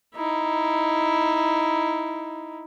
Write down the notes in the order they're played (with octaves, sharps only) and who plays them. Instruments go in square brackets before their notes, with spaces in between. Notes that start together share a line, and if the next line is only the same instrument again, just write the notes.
[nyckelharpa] D#4 E4